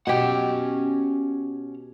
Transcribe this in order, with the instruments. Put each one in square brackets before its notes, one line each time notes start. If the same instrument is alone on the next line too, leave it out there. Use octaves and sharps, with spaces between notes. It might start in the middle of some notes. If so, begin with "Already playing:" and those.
[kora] B2 G4 [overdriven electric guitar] C#4 F#5